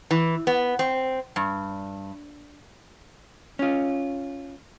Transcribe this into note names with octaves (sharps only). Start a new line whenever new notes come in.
E3
B3
C4
G2
C#4 F4